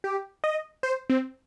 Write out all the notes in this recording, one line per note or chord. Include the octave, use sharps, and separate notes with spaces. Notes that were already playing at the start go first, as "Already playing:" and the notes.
G4
D#5
C5
C4